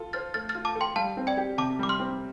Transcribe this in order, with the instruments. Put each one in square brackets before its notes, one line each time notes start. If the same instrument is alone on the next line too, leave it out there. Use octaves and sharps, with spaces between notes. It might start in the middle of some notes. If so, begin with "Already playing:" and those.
Already playing: [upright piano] F4 A4
[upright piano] C5 [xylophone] F6 A6
[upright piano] A3 [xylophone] F6 A6
[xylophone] F6 A6
[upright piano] F4
[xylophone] A5 D6
[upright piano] A4
[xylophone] G5 C6
[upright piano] G3 [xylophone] F5 A5
[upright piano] C4
[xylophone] D5 G5
[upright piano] G4
[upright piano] C3 [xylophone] A5 D6
[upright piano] G3 [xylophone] D6
[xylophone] C6 F6
[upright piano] C4